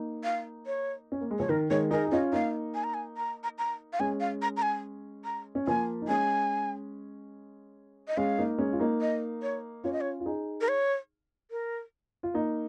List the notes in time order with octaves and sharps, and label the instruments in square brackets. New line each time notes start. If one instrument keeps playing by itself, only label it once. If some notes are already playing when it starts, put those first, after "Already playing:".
Already playing: [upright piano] A#3 D#4
[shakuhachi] F5
C#5
[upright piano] C#4
A#3
G#3
[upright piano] F3 [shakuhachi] C#5
[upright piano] D#3 [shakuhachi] A#4
[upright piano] D#3 G#3 [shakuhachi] C#5
[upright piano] D#4 G#4 [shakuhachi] A#4
[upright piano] G#4
[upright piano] C#4 F4 [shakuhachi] D#5
[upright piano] A#3 D#4 [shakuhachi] F5
[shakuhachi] G#5
A#5
G#5
A#5
A#5
A#5
F5
[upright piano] G#3 C#4 [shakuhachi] G#5
[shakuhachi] F5
A#5
A#5
G#5
A#5
[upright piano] C#4
[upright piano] F3 A#3 [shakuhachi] G#5
[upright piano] D#4
[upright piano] G#3 C#4 [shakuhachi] G#5
[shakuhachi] D#5
[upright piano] G#3 C#4 [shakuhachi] F5
[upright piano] A#3 D#4
G#3 C#4
F4
A#3 D#4
[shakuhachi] D#5
C#5
[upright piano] C#4 F4 [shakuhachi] C#5
[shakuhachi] D#5
C#5
[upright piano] F4
D#4 G#4
[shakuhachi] A#4
C#5
A#4
[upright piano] F4
A#3 D#4